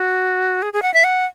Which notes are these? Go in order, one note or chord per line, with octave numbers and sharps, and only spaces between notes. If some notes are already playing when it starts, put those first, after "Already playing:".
Already playing: F#4
G#4
G#4
F#5
E5
F#5